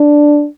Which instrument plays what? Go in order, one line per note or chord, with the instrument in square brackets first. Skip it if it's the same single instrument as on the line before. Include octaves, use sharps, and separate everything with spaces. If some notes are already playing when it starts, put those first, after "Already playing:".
Already playing: [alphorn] D4